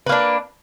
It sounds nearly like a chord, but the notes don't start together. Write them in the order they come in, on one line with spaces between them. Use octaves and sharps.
B4 A#3 D4